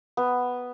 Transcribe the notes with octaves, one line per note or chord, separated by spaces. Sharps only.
B3